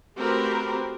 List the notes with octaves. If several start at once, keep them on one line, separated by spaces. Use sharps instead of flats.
A3 C4 F#4 G4 A#4 B4